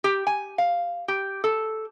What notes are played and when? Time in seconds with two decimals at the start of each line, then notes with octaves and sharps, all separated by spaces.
0.04 G4
0.27 G#5
0.58 F5
1.08 G4
1.44 A4